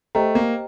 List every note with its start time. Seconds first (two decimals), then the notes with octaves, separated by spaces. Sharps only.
0.15 A3 G4 C5 D#5 G5 A#5
0.35 A#3